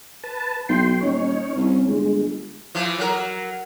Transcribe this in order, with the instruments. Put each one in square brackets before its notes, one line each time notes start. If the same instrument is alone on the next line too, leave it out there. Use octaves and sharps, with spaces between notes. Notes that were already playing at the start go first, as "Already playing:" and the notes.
[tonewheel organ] B4 A5
[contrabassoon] B1 [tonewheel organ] G5 C6
[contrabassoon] D#1 [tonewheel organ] C#4 D#4 C#5
[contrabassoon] C2 [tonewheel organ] C#4
[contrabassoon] G1 [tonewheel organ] G#3
[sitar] E3 F3
F#3 A#4